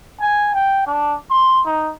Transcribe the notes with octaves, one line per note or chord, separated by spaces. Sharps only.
G#5
G5
D4
C6
D#4